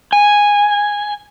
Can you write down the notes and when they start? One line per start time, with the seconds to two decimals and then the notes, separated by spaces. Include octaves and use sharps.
0.13 G#5